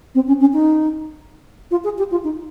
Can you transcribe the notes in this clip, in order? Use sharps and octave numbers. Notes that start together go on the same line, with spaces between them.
C4
C#4
C#4
D#4
F4
G#4
G4
F4
D#4